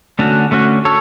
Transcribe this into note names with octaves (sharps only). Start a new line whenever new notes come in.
D3 A3 C#4 F#4
D3 A3 C#4 F#4
A4 C#5